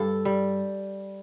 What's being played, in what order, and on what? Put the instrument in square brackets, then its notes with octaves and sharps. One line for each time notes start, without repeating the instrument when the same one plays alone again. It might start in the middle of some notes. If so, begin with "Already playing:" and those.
Already playing: [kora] G2 A4
G3